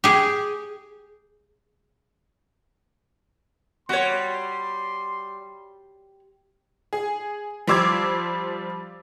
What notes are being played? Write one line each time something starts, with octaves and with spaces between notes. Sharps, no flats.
G4 G#4
G3 F#4 C#5 C6
G#4
F3 G3 C5 D6 E6 G#6